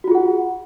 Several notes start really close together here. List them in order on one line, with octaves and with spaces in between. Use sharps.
F#4 F4 G#4 F#5